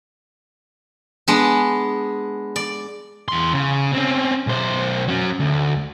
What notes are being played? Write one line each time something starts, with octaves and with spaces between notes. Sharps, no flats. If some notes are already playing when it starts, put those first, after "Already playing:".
G#3 B3 D4
D5
E2 C6
C#3
C4 C#4
B1 C5
F#3 C#4
D2